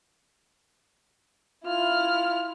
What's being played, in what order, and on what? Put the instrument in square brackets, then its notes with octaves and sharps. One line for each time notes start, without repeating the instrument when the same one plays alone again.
[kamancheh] E4 F6 [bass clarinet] F4